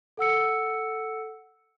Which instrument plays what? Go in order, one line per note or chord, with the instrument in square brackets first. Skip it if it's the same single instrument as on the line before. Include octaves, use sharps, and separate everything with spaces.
[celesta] A4 F#5 E6 C#7